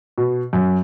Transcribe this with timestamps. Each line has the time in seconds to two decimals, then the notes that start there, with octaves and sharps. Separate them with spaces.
0.18 B2
0.53 F#2